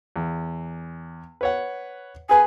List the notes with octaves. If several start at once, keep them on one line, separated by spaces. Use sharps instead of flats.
E2
B4 C#5 F#5
G#4 B4 G#5